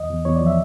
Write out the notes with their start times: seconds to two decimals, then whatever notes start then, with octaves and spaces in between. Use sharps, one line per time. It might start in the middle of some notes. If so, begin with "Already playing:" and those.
Already playing: E2 D#5
0.10 E2
0.25 E2 C#5
0.36 D5
0.41 F3
0.47 E5